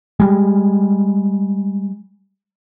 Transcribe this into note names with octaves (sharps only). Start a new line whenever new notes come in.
G3 G#3